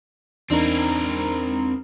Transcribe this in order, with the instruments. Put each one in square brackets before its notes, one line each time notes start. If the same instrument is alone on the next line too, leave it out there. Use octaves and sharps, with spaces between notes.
[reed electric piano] E2 D4 D#4 [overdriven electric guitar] C4 A#4